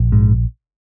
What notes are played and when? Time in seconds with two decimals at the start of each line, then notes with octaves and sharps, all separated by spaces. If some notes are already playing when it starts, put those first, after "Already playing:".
Already playing: A#1
0.12 G#2